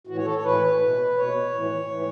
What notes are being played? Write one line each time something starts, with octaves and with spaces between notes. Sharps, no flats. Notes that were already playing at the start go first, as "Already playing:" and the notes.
A2 E3 F#4
C#5
A4
C#5
A2 E3 B4
B2
B2 C#5
A2 E3
A2 E3